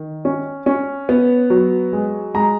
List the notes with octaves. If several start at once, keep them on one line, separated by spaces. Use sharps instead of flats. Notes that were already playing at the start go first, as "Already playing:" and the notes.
Already playing: D#3
C#4
C#4
B3
F#3
G#3
G#3 A#5